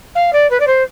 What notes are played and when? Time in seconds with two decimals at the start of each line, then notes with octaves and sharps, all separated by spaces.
0.15 F5
0.33 D5
0.50 B4
0.60 D5
0.67 C5